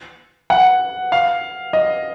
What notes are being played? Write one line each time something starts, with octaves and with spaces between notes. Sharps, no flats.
F#5
F5
D#5